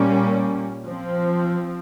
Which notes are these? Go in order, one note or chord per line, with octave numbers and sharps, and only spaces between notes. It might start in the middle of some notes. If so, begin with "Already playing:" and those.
Already playing: A#2 G3 A#3 C#4
F3 C4